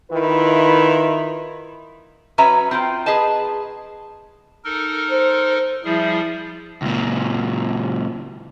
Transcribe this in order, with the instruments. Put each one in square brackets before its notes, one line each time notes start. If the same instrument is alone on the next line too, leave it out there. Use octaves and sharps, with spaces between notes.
[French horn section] D#3 E4 F4 B4
[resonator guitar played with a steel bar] F#3 C#4 B4 E5 A#5
C4 F4 G5
G#4 B4 D#5 A5
[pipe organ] D#4 A4 A#4
[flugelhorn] C5
[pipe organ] F3 G3 G#4 [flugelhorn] E4
[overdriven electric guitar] C#2 A#2